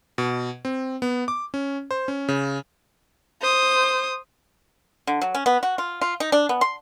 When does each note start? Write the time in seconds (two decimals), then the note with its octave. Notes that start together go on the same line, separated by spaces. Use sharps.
0.18 B2
0.65 C4
1.02 B3
1.28 D6
1.54 C#4
1.91 C5
2.08 C#4
2.28 C#3
3.41 C5 D#6
5.07 D3
5.21 F#3
5.34 C#4
5.46 B3
5.63 F#4
5.78 F4
6.01 F4
6.20 D#4
6.32 D4
6.49 B3
6.61 C6